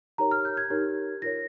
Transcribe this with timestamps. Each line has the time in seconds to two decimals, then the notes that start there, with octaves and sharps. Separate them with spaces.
0.18 D#4 G4 A#4 C#5 A#5
0.31 F6
0.45 G6
0.57 G#6
0.70 D#4 G4 A#4 C#5
1.22 F4 A#4 C#5 A#6